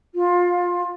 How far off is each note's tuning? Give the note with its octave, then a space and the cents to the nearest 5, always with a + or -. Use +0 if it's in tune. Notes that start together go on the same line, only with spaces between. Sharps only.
F4 +20